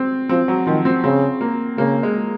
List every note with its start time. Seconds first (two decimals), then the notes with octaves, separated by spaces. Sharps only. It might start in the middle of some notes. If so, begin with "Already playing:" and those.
Already playing: C4
0.29 F3 C4
0.48 F#3
0.67 D#3 F3
0.85 C4
1.04 C#3 C4
1.41 A#3
1.78 C#3 A#3
2.03 G#3